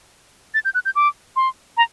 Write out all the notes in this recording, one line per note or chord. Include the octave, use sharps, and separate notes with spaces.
A6
G6
F#6
G6
D6
C6
A#5